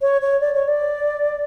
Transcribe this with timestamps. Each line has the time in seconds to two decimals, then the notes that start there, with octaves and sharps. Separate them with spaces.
0.02 C#5
0.22 C#5
0.41 D5
0.54 C#5
0.68 D5